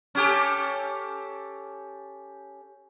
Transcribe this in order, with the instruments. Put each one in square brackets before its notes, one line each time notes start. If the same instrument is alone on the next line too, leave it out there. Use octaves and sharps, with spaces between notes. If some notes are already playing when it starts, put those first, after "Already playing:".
[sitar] C#4 G4 A4